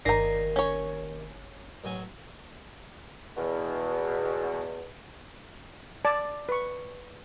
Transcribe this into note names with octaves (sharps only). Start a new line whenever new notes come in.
G1 D#2 D#3 D5 G#5 A#5 A#6 C7
C#4 C#5
A1 F#3 G#5
E2 B2
D5 A5
B4 C#6